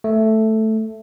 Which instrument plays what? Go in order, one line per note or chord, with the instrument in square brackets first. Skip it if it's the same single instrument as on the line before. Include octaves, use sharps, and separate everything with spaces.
[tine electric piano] A3